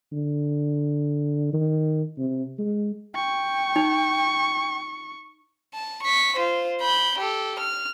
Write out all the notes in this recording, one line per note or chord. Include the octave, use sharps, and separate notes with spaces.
D3
D#3
C3
G#3
G5 C#6
D#4
A5
C#6 B6
F4 C5
B5 G6
G4 A4
F6